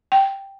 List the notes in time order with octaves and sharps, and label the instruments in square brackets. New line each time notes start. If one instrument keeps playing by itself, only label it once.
[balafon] G5